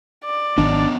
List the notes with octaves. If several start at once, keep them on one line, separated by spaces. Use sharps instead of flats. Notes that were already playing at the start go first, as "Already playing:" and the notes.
D5
G#1 D#3 B3 C#4 D4 D#5